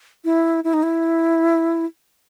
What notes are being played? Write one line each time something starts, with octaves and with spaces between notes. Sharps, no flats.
E4
E4
D#4
E4